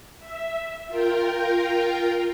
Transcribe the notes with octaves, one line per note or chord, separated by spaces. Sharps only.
E5
F4 A#4 G5